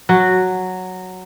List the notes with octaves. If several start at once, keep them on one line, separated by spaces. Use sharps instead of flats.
F#3 F#4